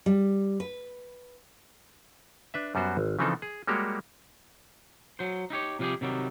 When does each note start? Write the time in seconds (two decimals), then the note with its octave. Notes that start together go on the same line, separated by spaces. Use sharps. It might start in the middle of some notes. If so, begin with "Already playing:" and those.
0.06 G3
0.60 B4
2.54 D4 B4 E5
2.75 F#2 G3 B3 F#4 C5
2.97 G#1
3.19 C#3 E3 F3 C4 D#4 A4
3.42 G#4
3.67 G3 G#3 A#3 F#4 G4 C#5
5.19 F#3 C5
5.50 D#4 E4 G4 C#5
5.79 C3 F3 G3 F4 G4 G#4
6.01 C3 D#3 F#3 G3